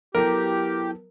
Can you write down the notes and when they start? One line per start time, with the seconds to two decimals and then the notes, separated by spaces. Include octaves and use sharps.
0.15 F#3 B3 E4 G4 A4 A#4